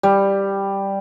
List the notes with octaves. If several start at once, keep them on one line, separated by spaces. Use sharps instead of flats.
G3